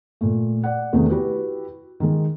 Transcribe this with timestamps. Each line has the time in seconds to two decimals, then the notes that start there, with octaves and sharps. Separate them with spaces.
0.21 A#2 A3
0.64 D5 F#5
0.93 E2 C3 D#3 A3 D#4
1.09 E4 F#4 G4 B4
2.00 D#3 G#3